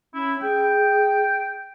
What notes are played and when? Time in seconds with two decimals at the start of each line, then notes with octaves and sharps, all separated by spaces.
0.14 C#4 E4
0.42 G#4 G5